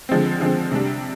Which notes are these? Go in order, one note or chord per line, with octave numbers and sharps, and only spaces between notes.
D3 F3 G#3 C4
D3 F3 G#3 C4
C3 G3 D4